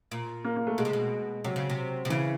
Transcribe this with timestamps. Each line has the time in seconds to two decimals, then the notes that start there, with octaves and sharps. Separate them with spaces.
0.11 A#2
0.44 A#3
0.56 A#3
0.67 A3
0.78 B2 G#3
0.85 C3
0.93 B2
1.44 C3 F#3
1.56 C#3
1.70 C3
2.05 C3
2.10 C#3 E3